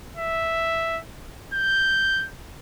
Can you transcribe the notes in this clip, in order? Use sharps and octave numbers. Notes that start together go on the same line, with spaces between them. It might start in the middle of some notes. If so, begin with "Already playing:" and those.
E5
G6